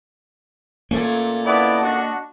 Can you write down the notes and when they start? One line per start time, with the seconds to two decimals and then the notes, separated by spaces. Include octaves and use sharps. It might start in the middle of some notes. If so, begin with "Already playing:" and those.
0.91 A#2 A3 A#3 C#4
1.45 B3 E4 D5 D#5 F#5 A5
1.82 D4 F#4